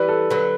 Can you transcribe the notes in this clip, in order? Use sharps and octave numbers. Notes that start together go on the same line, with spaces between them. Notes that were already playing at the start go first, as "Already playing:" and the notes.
Already playing: E3 G3 B4
A4
D3 F#3 B4